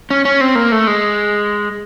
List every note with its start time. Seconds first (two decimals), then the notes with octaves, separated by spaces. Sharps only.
0.10 C#4
0.25 C#4
0.41 C4
0.55 A#3
0.72 A3
0.87 G#3